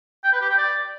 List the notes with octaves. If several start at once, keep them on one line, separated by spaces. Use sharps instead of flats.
G5
B4
G4
G5
D5